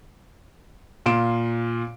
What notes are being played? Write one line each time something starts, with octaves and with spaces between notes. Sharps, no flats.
A#2 F4 C6 D7 E7